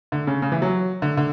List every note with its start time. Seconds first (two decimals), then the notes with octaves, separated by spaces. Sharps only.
0.12 D3
0.27 C#3
0.42 C#3
0.52 E3
0.62 F#3
1.02 D3
1.17 D3